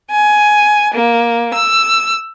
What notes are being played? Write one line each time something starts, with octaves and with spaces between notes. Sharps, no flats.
G#5
A#3
E6